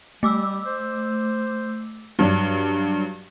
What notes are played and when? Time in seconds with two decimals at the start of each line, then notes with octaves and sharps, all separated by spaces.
0.23 G3 A3 D6 E6
0.65 C5
2.19 G2 F#3 D4